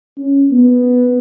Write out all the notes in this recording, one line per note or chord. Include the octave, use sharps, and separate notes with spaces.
C#4
B3